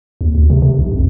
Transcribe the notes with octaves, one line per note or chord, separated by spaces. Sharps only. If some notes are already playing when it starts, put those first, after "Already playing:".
D#2
D2
C3
C3
B1
F2